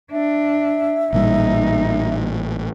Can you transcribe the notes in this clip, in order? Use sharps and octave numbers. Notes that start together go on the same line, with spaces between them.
D4 E5
A1 A#2 G3 D#4